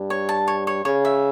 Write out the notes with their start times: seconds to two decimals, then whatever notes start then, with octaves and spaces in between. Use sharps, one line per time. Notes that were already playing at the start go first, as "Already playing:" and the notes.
Already playing: G2
0.10 C#5
0.29 A5
0.48 C#5
0.67 C#5
0.85 C#3 C#5
1.05 E5